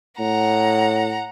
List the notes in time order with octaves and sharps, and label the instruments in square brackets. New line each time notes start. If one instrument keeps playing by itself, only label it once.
[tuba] A2 [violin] F#5 A#5